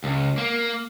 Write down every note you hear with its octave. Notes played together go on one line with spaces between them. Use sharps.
C#2
A#3